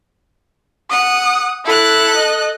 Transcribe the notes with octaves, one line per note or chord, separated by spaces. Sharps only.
F#5 D#6
E4 A4 F#6
D#5